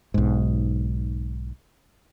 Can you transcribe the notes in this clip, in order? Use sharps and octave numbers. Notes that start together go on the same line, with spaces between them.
B1 G#2